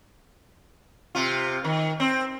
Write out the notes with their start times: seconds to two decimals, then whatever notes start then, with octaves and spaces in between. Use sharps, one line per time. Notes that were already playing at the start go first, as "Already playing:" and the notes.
1.15 C3 F4
1.65 D#3
2.00 C4